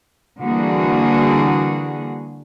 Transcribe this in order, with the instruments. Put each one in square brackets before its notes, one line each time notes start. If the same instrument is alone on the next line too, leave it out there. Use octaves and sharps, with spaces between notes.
[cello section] D3 E3 G3 A#3 F#4 G#4